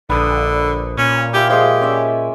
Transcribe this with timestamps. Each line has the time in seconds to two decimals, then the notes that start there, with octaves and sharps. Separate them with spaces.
0.10 A#1 D3 B4 A5 D#6
0.98 A#2 C#4
1.33 F4 G4 E5 G#5
1.49 F3 G#3 G4 C6
1.81 C#4 D5 E5